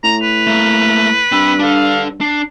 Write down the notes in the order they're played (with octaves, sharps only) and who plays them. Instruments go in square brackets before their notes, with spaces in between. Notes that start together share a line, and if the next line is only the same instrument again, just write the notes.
[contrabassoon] A2 [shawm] A#5 [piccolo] F7
[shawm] B4
[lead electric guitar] A3 A#3
[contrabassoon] G2 [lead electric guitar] C4 B5 [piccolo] E6
[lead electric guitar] D4 A4 [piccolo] F5
[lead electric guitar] D4 [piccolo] C7